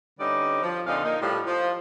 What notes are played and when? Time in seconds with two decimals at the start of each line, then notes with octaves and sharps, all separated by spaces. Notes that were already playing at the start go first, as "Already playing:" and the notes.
0.19 D3 G3 C#4 D#4 B4 D5
0.63 F3
0.87 F2 A#2 D3 D#4 F5
1.04 A#3 D#4
1.21 A2 F3 G3
1.47 F3